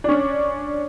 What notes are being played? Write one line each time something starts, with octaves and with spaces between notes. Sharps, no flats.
C#4 D4